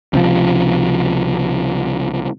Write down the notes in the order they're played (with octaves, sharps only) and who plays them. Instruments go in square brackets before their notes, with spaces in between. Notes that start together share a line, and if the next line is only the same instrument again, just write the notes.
[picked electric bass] C#2 C3 F3